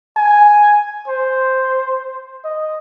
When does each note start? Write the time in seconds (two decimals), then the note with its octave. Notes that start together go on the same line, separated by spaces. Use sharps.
0.17 G#5
1.08 C5
2.44 D#5